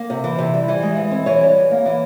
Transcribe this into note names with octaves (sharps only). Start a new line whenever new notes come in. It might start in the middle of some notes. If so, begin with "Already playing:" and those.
Already playing: A#3
C3
E3
C3
G3
E3
G#3
E3
C4
E3 C#5
G3
E3
A#3
E3